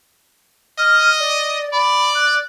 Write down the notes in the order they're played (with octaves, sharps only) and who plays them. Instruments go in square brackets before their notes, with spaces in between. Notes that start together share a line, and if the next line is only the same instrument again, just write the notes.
[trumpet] D#5 [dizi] F6
[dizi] D5
[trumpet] D5 [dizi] B5
[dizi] F#6